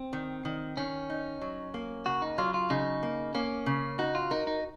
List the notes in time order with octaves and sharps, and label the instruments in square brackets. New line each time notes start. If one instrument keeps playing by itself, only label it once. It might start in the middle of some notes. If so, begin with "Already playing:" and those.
Already playing: [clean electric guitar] C4
[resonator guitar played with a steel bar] D#3
D#3
[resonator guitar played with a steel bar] D#3 [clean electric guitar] C#4
[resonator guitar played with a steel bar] D#4
F#3
A#3
[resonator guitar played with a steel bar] C#3 [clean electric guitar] F#4
[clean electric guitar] D#4
[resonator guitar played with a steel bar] F#3 [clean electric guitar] F4
[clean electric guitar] F4
[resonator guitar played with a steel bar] C#3 [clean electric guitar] D#4
[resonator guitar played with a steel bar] A#3
[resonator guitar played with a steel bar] A#3 [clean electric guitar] C#4
[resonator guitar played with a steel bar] C#3
[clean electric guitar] D#4 [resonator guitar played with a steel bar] F#4
[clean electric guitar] F4
[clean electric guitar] D#4 [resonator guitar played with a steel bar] A#4
[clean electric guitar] D#4